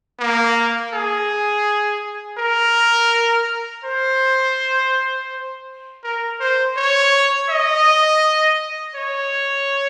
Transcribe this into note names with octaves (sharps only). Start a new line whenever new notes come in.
A#3
G#4
A#4
C5
A#4
C5
C#5
D#5
C#5